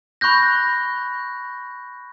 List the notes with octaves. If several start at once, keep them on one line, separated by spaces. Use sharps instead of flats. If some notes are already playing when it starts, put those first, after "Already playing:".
B5 C#6 F#6 G6 A#6